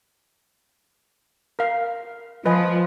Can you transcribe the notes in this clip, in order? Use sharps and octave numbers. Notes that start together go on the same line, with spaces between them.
A#4 F5
F3 B4 D#5 G#5